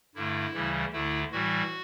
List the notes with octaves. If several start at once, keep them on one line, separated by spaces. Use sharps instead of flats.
G2 D3 A3 E4
D2 C#3 E3 G3
D2 D3 A3 E4
A2 E3 G3 F#4